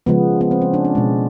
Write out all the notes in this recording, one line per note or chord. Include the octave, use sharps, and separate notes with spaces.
C#3 F3 G#3 B3
B3
C4
C#4
D4
D4
B2 G#3